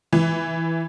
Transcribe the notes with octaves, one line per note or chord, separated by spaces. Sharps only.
E3